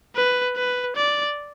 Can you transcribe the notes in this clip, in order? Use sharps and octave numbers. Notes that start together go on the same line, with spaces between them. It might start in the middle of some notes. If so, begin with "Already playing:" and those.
B4
B4
D5